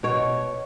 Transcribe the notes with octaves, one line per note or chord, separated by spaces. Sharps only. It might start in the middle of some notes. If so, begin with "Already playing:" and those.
B2 C#5